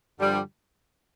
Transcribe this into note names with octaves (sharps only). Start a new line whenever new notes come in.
G2 D3 F3 G3